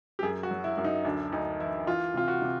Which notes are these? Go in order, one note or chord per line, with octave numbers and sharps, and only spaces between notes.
G4
F#2 G#4
F#4
F#3
E4
F#2
D#4
D2 D4
D2 D#4
E3 E4
E3 F4
C3 F4
F#4
C3